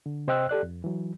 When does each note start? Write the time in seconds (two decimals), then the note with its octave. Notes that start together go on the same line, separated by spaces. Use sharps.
0.06 D3
0.28 C3 C5 D#5 G5 E6 F#6
0.49 G4 A4 D5 F#6
0.63 F2
0.84 E3 F#3